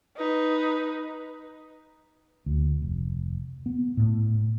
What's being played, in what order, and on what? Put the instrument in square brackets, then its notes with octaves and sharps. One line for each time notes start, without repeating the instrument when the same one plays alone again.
[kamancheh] D#4 B4
[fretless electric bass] D2
F1
B3
A2